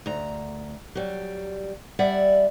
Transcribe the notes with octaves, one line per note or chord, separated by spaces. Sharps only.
D2 A#5
F#3 G3
G3 D5 E5 F#5